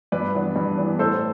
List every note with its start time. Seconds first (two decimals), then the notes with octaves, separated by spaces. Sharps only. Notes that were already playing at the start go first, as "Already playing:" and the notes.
0.12 G2 B4 D5
0.34 E3 B3 D4
0.56 G2
0.78 E3 B3 D4
0.99 A2 A4 C5